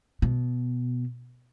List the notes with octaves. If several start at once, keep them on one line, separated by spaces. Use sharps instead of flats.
B2